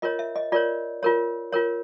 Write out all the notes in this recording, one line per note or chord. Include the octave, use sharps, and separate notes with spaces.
F4 A#4 C#5 D#5
E5
D#5
F4 A#4 C#5 D5
F4 A#4 C#5
F4 A#4 C#5